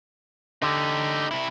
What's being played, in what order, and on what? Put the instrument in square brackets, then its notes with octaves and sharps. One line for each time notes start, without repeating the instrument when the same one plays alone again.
[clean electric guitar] D3 [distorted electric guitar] D#4 G4
[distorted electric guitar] C3 E4